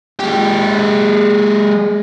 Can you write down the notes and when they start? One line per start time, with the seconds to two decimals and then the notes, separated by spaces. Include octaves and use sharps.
0.20 G#3 G4